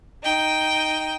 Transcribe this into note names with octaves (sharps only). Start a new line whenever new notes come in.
D#4 G5